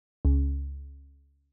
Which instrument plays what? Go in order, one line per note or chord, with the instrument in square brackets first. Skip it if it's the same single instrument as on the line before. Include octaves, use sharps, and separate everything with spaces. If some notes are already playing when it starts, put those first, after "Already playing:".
[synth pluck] C#2